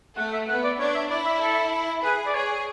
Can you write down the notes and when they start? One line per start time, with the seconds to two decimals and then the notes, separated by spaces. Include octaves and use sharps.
0.17 A3 F#5
0.33 E5
0.48 B3 F#5
0.64 D5
0.79 D4 C#5
0.95 E5
1.10 E4 D5
1.26 E5
1.41 A4
2.04 G#4 B4
2.26 D5
2.34 G#4 C#5